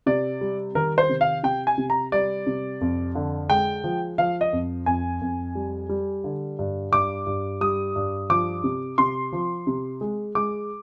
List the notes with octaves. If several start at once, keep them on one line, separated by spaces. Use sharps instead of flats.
C3 D5
G3
D#3 A#4
C5
C3
F5
C3 G5
G#5
C3
A#5
G3 D5
C3
F2
D3
G#3 G5
F3
F3 F5
D#5
F2
F2 G#5
F2
G3
G3
D3
G2
G2 D6
G2
G3 D#6
G2
F3 D6
C3
C3 C6
F3
C3
G#3
G#3 D6